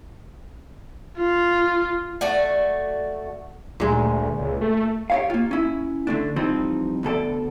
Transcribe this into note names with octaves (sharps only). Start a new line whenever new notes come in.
F4
A3 F#4 D5
D2 A#2 G#3
C#2
A3
G4 C#5 F5
A#3 F4
C#4 E4
D3 A3 D4
E3 F3 G3 C4 D#4
D2 B2 A4 D5